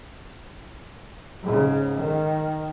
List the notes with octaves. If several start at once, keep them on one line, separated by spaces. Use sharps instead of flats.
G#2 C#3
D#3